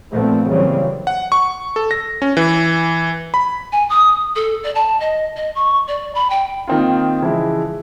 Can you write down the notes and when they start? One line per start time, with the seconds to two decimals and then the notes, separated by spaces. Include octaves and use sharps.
0.11 A#2 F3 A3 B3 C4
0.48 C#3 E3 F#3 G3 A#3 C4
1.07 F#5
1.32 C#6
1.76 A4
1.91 A#6
2.22 C#4
2.37 E3
3.34 B5
3.72 G#5
3.90 D#6
4.36 A4
4.64 D5
4.75 A5
5.00 D#5
5.36 D#5
5.55 C#6
5.88 D5
6.15 B5
6.30 G5
6.67 D#3 A#3 C4 D#4 F4
7.22 C#3 E3 F3 G#3 E4